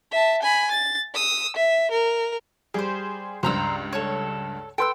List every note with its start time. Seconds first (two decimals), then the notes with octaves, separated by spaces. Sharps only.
0.11 E5 A5
0.42 G#5 B5
0.71 A6
1.14 D#6 E6
1.56 E5
1.91 A#4
2.74 G3 G4 G#4 C5
3.43 C#2 G2 C5 A#5 E6
3.93 A4 C#5
4.78 A4 B4 G5 C6 E6